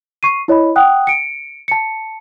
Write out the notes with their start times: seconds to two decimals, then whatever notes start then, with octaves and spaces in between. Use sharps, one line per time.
0.23 C#6 C7 D#7
0.48 E4 C#5 D#5 B5
0.76 F#5 G5 D#6 F#6
1.07 C#7 D7
1.68 A5 C#7